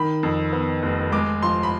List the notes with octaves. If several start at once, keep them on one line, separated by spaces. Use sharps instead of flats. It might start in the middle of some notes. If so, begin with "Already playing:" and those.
Already playing: D#3 B5
F2
B3
F1
G#3 D6
F3 C6
B5